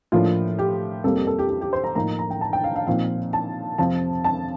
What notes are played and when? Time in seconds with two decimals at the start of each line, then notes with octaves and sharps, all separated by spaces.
0.12 A2 F3 A#3 D4 F4
0.59 G4
1.04 F2 C3 G3 A#3 A4
1.16 G4
1.27 A4
1.39 G4
1.49 G4
1.61 G4
1.73 C5
1.84 A#5
1.95 A2 F3 A#3 D#4 A#5
2.19 A#5
2.30 G5
2.41 A5
2.53 G5
2.64 F5
2.76 F5
2.87 A#2 F3 C4 D#4 F5
3.33 A5
3.78 F2 C3 F3 C4 A5
4.24 A5